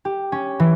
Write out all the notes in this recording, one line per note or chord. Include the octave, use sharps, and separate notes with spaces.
G4
C#4
E3